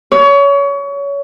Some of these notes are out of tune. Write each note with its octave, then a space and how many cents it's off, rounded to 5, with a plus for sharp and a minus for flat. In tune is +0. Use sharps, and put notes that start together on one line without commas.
C#5 +25